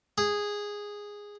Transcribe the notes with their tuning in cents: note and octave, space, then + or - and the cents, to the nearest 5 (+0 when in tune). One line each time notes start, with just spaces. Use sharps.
G#4 -10